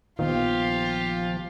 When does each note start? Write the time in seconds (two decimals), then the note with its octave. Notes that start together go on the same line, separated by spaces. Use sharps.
0.19 A#1 D#3 F3 B3 F4 G4